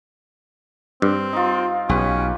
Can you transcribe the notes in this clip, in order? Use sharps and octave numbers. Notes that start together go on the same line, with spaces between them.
G2 C4
D#4 F4
B1 C#4 G4 B4